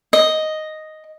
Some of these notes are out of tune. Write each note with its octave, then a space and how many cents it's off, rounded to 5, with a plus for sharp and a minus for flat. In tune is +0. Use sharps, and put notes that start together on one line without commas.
D#5 +0